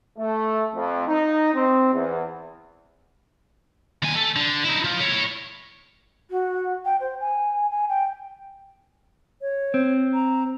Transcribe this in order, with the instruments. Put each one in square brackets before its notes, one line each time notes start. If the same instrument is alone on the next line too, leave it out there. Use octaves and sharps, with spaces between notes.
[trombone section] A3
F2
D#4
C4
E2
[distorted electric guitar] D#2 G#5
A3
D3
D#4 E4
F3
E4 C#5
[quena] F#4
G5
C5
G#5
G#5
G5
[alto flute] C#5
[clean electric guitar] C4
[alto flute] A#5